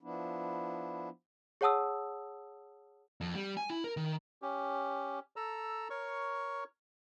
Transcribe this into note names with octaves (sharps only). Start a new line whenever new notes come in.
F3 B3 D4 E4
G#4 C#5 F#5 A5 D#6 E6
F2
G3
G#5
E4
A#4
D#3
C#4 G4
A4 A#5 E6
A#4 C#5 C#6